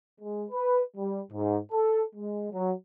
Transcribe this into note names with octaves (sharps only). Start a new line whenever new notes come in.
G#3
B4
G3
G#2
A4
G#3
F#3